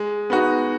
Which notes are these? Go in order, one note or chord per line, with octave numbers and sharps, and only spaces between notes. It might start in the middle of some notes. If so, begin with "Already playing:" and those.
Already playing: G#3
B3 D#4 F#4